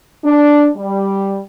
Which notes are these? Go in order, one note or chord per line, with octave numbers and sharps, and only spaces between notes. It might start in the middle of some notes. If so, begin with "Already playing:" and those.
D4
G3